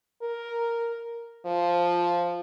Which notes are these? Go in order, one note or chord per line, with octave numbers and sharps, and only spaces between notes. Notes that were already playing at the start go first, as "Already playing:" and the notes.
A#4
F3